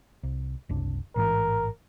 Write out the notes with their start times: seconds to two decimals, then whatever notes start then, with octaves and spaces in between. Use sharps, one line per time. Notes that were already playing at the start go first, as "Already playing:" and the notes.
0.23 C2
0.69 F#1 C2 D4
1.16 A1 G#2 E3 A#4